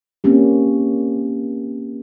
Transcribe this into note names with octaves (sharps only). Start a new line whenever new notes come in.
A#3 C4 C#4 G4